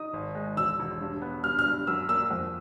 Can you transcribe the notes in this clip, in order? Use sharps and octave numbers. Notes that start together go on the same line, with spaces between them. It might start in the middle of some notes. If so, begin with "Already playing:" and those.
Already playing: D#4 D#6
G#1
G#3
E1 E6
E1
G2
B3
G2 F6
F6
G2
F#2 E6
A#3 E6
F2